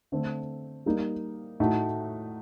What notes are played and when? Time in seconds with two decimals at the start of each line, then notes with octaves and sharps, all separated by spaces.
0.12 D3 A3 C4
0.86 G3 A#3 D#4
1.60 A2 A3 D#4 F#4